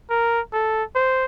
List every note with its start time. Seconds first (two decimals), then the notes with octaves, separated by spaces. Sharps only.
0.10 A#4
0.53 A4
0.96 C5